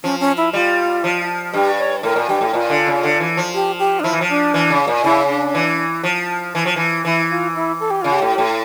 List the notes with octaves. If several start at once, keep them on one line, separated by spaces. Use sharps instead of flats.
F3 C#4
C#4
E4
G3 F4
F3
G2 G4
C#5
A2 A#4
A#2
G2 G4
A2
A#2 F4
D3
C#3
D3
E3
F3
G4
G4
D4
F3 E4
E3
F3
D4
E3
C#3
A#2
C#3 E4
D4
E3
F3
E3
F3
E3
E3 E4
F4
E4
A4
G4
C#3 F4
G4
A2
A2